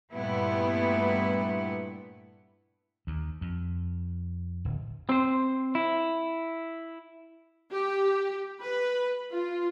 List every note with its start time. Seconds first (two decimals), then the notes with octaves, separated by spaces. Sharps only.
0.12 G2 A#2 G3 A3 B3 E4
3.07 D#2
3.41 F2
4.65 D1
5.09 C4 C5
5.75 E4
7.73 G4
8.62 B4
9.32 F4